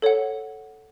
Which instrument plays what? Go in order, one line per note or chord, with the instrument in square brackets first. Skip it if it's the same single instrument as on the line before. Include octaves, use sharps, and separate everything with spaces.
[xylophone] A4 C#5 F#5